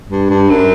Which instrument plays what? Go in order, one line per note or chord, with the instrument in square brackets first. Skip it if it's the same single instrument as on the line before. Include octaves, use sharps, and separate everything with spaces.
[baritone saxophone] G2
G2
F#2